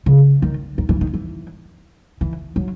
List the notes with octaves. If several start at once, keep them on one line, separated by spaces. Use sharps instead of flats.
C#3
D#3
D#3
E3
D#3
E3
E3
F#3